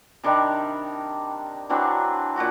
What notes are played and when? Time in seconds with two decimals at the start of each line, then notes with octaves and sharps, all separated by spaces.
0.24 C3 D#3 G3 D4
1.70 E3 F#3 C4 D4
2.36 A#2 F3 F#4 D6